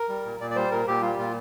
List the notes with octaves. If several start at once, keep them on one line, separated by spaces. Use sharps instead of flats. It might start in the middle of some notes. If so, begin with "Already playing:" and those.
Already playing: A#4
G3
A#2
A#2 D5
D5
G3 C5
A#2 A#4
A#2 G4
G3 F4
A#2 F4